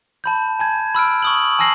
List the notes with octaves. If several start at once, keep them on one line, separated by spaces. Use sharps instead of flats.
A5 B5 G6
G#5 A5 G#6
B5 E6 F6 D7
C#6 D#6 F#7
G#5 A5 E6 A#6 C7 F#7